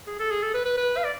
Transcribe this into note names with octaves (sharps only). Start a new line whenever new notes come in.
G#4
A4
G#4
A4
B4
B4
B4
F5
D5